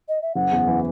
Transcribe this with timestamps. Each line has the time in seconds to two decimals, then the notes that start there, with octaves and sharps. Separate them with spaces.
0.08 D#5
0.22 E5
0.35 F#1 F#5
0.52 E2
0.67 E3